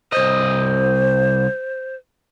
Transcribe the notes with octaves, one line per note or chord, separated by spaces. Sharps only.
C2 C5 D#5